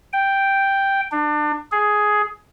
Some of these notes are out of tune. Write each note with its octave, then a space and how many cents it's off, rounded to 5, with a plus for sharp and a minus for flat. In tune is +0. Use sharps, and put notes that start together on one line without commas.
G5 +0
D4 +30
G#4 +10